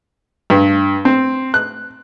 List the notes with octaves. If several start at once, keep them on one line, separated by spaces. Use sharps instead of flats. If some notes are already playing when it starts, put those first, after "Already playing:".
G2
C4
F#6